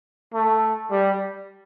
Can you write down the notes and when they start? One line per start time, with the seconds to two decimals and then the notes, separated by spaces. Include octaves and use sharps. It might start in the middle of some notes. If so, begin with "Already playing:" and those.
0.34 A3
0.91 G3